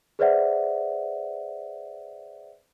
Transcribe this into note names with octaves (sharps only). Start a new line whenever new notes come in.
G#4 B4 C5 D5 E5 F#5